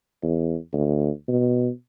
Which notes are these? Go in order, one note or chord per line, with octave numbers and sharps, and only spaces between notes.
E2
D2
B2